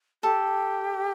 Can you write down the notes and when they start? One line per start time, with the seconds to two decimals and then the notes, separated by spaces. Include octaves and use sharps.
0.23 G4 A4